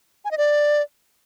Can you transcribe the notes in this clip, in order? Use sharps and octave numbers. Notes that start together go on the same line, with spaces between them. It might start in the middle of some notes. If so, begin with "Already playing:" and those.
G#5
D#5
D5